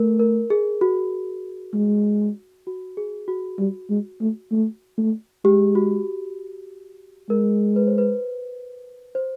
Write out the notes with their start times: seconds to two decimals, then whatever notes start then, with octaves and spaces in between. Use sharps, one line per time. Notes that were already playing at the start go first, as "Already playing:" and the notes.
Already playing: A3 A#4
0.20 A#4
0.50 G#4
0.81 F#4
1.74 G#3
2.67 F#4
2.97 G#4
3.28 F#4
3.59 G3
3.90 G#3
4.21 A3
4.52 A3
4.98 A3
5.45 G#3 G4
5.75 F#4
7.30 G#3 A#4
7.76 B4
7.87 C5
7.98 B4
9.15 C5